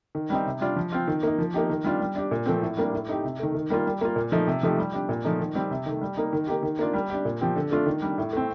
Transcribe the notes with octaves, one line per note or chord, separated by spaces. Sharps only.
D#3
G3 C4 D#4
C3
G3 D4 F4
F3
C4 F4
D#3
A#3 D#4
F3
A#3 D#4 G4
D#3
G3 D4 F4
G3
D4 G4
A#2
F3 A3 C4
A2
G3 A#3 D4
A2
A3 D#4 G4
C3
D#3 A3
D#3
G3 A#3 F4
G3
A#3 F4
A#2
F3 A3 D#4
C3
F3 A3 D#4 G4
G3
D4 G4
A#2
F3 A3 D#4
D#3
G3 C4 G4
C3
D#3 A3
G3
A#3 D#4
D#3
A#3 D#4 G4
D#3
A#3 D4 F4
G3
D4 G4
A#2
F3 C4 G4
D3
A3 D4 F4
D#3
G3 D4
A2
A3 C4